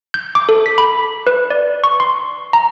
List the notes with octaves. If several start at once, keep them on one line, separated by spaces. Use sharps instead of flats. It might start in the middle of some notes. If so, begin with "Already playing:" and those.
G6
D6
A4
B6
B5
B4
D5
C#6
C6
A#5